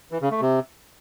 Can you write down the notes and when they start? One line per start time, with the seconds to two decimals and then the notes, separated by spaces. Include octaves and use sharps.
0.12 E3
0.21 C#3
0.31 A3
0.41 C3